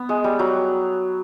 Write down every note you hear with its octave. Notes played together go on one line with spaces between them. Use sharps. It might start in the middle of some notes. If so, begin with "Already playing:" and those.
Already playing: B3
G#3
G3
F#3